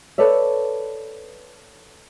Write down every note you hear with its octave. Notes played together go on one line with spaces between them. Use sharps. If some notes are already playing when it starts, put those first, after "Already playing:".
A4 B4 C#5 D5 E5